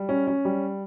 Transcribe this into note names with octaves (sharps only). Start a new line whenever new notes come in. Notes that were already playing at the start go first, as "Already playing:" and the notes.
Already playing: G3
C#4
C#4
G3